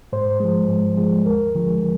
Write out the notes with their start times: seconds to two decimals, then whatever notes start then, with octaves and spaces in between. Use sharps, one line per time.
0.13 G#2 C5
0.40 F3 G#3
0.69 G#2
0.97 F3 G#3
1.26 D#2 A#4
1.55 D3 F3 G#3